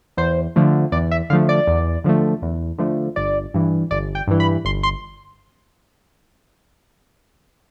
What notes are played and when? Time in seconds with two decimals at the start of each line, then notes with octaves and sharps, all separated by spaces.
0.17 E2 C5
0.56 D3 F3 A3
0.92 E2 D5
1.11 E5
1.30 D3 F3 A3 F5
1.49 D5
1.67 E2
2.04 D3 F3 A3
2.42 E2
2.78 D3 F3 A3
3.16 G1 D5
3.54 G2 E3
3.91 G1 D5
4.15 G5
4.27 G2 E3
4.40 B5
4.65 G1 C6
4.83 C6